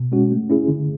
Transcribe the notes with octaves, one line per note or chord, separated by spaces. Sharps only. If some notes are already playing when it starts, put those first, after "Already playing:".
Already playing: B2
G#3 C#4 F#4
A3
C#4 E4 G#4
D3